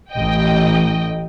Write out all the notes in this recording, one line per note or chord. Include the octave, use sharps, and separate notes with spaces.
A1 D#5 G5